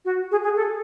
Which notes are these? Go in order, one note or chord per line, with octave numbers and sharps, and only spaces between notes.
F#4
G#4
G#4
A4